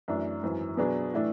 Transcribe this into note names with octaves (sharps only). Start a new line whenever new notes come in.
F#2 E3 A3 D4
G#1 F#2 E3
B2 F#3 B3 D4 G#4
A2 E3 A3 D4